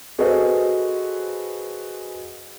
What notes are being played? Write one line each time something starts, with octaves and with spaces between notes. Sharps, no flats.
F#4 G#4 A4 B4 C5 D#5